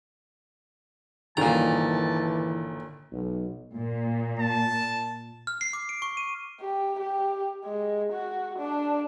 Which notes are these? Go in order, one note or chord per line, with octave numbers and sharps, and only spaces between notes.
G1 A#2 D#3 E3 A5 A#5
B1
A#2
A5
F6
C7
D6
D7
C#6
D#7
G4
G4
G#3
F#4
D4